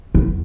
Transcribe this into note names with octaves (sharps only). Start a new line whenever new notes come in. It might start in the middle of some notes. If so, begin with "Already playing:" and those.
E2